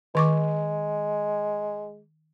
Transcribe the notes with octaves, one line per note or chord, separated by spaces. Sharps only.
D#3 G#3 C#6 D6